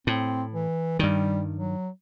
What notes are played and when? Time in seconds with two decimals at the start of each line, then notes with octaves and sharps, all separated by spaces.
0.07 A2 C4
0.53 E3
0.99 G2 D#3 G3
1.56 F#3